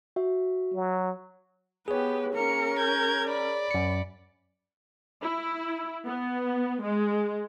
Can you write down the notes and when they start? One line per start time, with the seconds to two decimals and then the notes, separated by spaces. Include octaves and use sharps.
0.16 F#4 E5
0.73 F#3
1.88 B3 G4 G#4 B4 C#5
2.33 A#3 C#4 A#4 C#7
2.78 G6 G#6
3.27 D5 B5
3.71 F#2 C#7
5.24 E4
6.05 B3
6.82 G#3